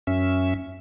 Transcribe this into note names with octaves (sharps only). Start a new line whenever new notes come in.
F#2 C#4 E5